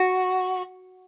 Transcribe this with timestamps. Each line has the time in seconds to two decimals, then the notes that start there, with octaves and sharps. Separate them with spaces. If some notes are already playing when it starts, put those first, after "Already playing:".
Already playing: F#4